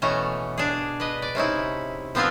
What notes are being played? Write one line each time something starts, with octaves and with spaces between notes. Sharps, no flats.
B2 E3 A3 C#4 A#5
D4 G#4
B4 D#5
D5
C3 C#4 D#4 E4
F3 B3 C4 D4 F4 G#5